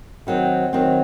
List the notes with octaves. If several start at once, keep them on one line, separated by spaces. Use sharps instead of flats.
D#3 F#3 C4
D#3 F#3 C4